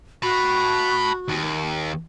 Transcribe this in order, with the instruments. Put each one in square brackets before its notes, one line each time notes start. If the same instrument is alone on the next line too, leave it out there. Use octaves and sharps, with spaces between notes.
[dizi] F#4 [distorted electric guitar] A5 B5
[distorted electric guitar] D#2